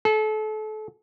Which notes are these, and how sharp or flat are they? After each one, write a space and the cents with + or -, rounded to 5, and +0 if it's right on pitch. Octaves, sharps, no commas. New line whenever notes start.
A4 -30